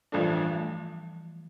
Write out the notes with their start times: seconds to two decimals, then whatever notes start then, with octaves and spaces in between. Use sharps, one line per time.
0.12 A1 G2 E3 F3 A3 D4
0.33 E3 G3
0.53 F3 A3